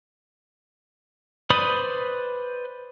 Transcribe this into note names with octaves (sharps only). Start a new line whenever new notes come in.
B4 C5 D5 B5 D#6